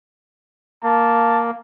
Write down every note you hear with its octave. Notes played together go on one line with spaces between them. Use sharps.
A#3 A5